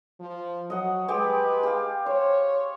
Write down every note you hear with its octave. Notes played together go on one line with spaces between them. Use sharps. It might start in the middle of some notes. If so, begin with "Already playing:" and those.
F3
F#3 D#5 F#5
G#3 G4 B4
G4 F5
C5 C#5